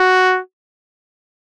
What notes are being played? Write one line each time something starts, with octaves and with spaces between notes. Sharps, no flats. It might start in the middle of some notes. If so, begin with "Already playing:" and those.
Already playing: F#4